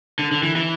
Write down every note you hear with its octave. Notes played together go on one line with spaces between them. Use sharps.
D3
D3
E3
E3